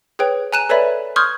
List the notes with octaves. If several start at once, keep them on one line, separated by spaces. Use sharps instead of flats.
G#4 B4 C#5 G5
G#5 A#5 F#6 D#7 E7
A4 B4 C#5 D5 E5 B5
C6 C#6 D#6 F6 G6 G#6